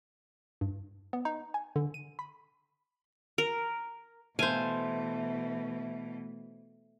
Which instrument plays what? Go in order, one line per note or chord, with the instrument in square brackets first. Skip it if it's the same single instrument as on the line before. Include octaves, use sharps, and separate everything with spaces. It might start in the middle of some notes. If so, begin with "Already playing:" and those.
[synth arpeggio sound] G2
B3
D#4
G#5
D3
D#7
B5
[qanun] A#4
[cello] B2 E3 [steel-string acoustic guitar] A3 [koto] C5 F5 [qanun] G#5